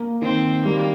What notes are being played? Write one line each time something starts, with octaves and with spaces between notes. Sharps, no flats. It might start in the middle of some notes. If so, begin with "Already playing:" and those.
Already playing: A#3
D#3 C4
G3 A#3